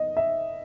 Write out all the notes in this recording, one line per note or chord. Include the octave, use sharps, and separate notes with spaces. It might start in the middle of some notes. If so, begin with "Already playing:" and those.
Already playing: D#5
E5